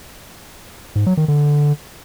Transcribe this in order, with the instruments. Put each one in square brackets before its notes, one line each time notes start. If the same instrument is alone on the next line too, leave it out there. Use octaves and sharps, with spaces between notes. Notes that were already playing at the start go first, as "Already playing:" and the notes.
[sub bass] G#2
F#3
D#3
D3